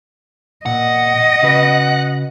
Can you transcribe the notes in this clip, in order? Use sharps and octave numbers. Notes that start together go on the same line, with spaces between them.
A#2 D#5 F#5
C#3 F#4 B4